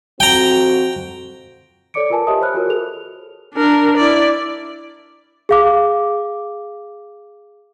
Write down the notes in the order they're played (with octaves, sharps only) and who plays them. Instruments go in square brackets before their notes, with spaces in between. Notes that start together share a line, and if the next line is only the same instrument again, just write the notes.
[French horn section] F2 C4 F#4 [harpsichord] G5 A#5
[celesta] A4 C#5 D5 D6 C#7 D7
F4 A#4 B4 G#5 A5
G4 C#5 D#5 E5 A5 D#6
C5 C#5 B5 F6 F#6
F4 F#4 A#4 C#5
G#4 A4 F7
[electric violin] D4 A#4
E4 D5
[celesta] G#4 F5 D6